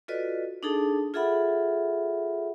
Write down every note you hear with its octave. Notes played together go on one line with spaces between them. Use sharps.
F4 F#4 A4 B4 D5 D#5
D4 D#4 G#4 A4 A5
F4 G#4 A4 E5 F#5 B5